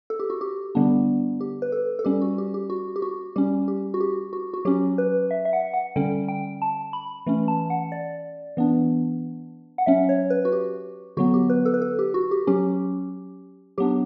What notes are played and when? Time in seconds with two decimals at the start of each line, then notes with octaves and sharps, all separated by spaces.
0.10 A4
0.20 G4
0.30 F#4
0.41 G4
0.75 D3 G3 B3 D4
1.41 G4
1.62 B4
1.72 A4
1.99 A4
2.04 G3 C#4 G4
2.22 F#4
2.38 G4
2.54 G4
2.70 F#4
2.96 G4
3.02 F#4
3.36 G3 C#4 G4
3.68 G4
3.94 F#4
4.01 G4
4.33 F#4
4.54 F#4
4.65 F#3 C#4 G4
4.98 B4
5.31 E5
5.45 E5
5.53 F#5
5.74 F#5
5.96 D3 G3 C#4 G5
6.28 G5
6.62 A5
6.93 B5
7.26 E3 A3 C#4
7.48 A5
7.70 F#5
7.92 D5
8.57 E3 B3 D4
9.78 F#5
9.86 F#3 C#4 E5
10.09 C#5
10.30 B4
10.45 F#4
10.52 G4
11.17 D3 F#3 B3 F#4
11.34 G4
11.50 B4
11.65 A4
11.74 B4
11.82 A4
11.99 G4
12.14 F#4
12.31 G4
12.47 F#3 C#4 G4
13.78 F#3 B3 D4 G4